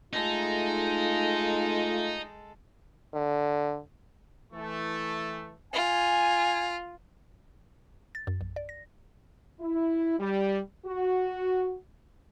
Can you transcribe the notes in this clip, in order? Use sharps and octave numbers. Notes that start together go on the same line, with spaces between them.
G#3 A3 D#4 F4 A4
D3
E3 A3
F4 G#5
A6
F#2
A#1
D5
A#6
E4
G3
F#4